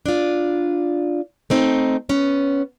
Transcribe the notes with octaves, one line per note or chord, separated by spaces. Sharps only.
D4 F4
A3 C4 D#4
B3 C#4